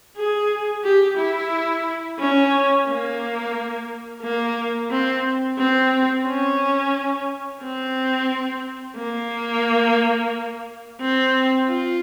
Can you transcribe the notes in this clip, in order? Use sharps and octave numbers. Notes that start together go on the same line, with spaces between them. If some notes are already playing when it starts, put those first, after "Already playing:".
G#4
G4
E4
C#4
A#3
A#3
C4
C4
C#4
C4
A#3
C4
F4